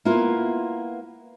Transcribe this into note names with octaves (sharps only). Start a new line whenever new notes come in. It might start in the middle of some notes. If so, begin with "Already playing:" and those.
A#3 B3 E4 F4